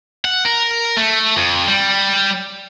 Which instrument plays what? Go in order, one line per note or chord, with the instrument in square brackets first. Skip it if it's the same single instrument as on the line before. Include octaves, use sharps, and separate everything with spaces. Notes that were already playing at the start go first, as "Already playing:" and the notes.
[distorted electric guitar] F#5
A#4
A3
F2
G3